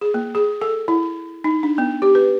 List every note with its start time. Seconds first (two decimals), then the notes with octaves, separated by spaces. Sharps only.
0.01 G#4
0.14 A#3
0.35 G#4
0.61 A4
0.88 E4
1.44 D#4
1.63 D4
1.78 B3
2.02 G4
2.15 B4